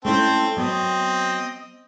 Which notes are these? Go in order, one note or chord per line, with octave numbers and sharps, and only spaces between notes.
A3 C4 C#4 E4 A4 C5
F#3 B3 C4 D#5